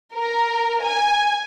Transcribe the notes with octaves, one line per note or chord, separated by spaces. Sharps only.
A#4
G#5